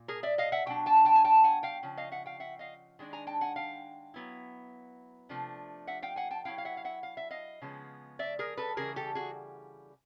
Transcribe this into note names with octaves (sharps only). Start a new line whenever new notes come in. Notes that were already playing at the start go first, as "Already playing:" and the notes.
Already playing: A#2
G#4 A#4
D5 E5
D#5 F5
E5 F#5
B2 F#3 D4 G5
G5 A5
G5 A5
G#5
G5 A5
F#5 G#5
F5 G5
C#3 F3
D#5 F5
E5 F#5
F5 G5
E5 F#5
D#5 F5
D#3 G#3 D4
G#5 A#5
G5 A5
F#5 G#5
F5 G5
F#3 B3 E4
C3 F3 A3 D4
E5 F#5
F5 G5
F#5 G#5
G5 A5
F#3 B3 E4 F5 G5
F5
E5 F#5
F5
E5 F#5
F5
E5
D#5 F5
C#3 F3 G#3 B3
D5 E5
G#4 A#4
A4 B4
C#3 E3 G3 G#4 A#4
G4 A4
F#4 G#4